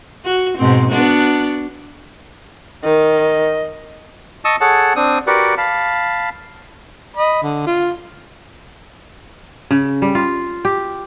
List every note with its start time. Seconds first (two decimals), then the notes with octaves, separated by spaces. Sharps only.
0.25 F#4
0.57 G#2 B2 C4
0.90 B3 D4 F#4
2.84 D#3 D#5
4.45 D#5 A5 C#6 D#6 E6
4.61 G#4 A4 C#5 F#5 A5
4.96 C4 D4 D#6
5.27 F#4 G4 A#4 B4 D5 F#5
5.58 F5 A5 B5
7.16 D#5 B5
7.43 D3
7.67 F4
9.71 C#3
10.02 G3
10.15 F4
10.65 G4